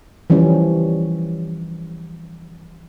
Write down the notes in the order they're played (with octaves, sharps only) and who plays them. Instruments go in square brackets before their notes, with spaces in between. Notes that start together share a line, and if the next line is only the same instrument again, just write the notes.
[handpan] E3 F3 G3 C#4